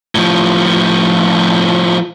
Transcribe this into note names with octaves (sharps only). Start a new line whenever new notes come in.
A2 F3